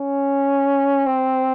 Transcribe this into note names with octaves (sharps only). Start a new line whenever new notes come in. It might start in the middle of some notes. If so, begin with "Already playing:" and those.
Already playing: C#4
C4